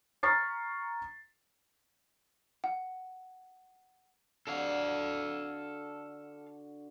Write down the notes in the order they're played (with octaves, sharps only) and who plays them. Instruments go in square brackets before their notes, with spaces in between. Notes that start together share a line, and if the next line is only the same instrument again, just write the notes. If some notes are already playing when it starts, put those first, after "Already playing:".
[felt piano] A#5 C#6 F6 A6 B6 C7
[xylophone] F#5
[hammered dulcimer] D3 F#4 [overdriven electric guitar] A4 F5